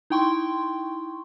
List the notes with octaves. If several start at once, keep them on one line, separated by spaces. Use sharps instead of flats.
D#4 E4 G5 C6 C#6